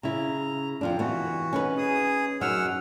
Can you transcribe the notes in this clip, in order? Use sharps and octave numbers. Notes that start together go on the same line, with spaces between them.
C#3 E4 A#5
F2 F3 D4
E3 B3 F#4
C#4 D#4 B4
G#4 D#6
F#2 F#3 D#4 F#5 E6 F6